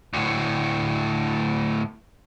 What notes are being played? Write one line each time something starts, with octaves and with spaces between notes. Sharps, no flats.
D2 A2